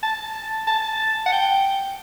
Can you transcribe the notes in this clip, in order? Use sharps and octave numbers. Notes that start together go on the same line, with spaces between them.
A5
A5
F#5
G5